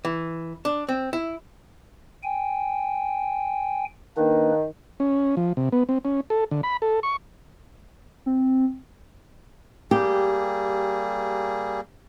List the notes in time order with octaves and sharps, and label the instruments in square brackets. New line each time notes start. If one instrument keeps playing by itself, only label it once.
[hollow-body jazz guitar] E3
D4
C4
E4
[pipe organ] G5 G#5
[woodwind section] D#3 [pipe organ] A#3 D4 B4
[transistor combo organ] C#4
F3
C3
B3
C4
C#4
A4
D3
B5
A4
C#6
[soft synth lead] C4
[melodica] G3 A#3 G#4 [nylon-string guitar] G4